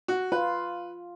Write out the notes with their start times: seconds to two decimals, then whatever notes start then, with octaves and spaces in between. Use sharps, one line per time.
0.08 F#4
0.32 F4 B4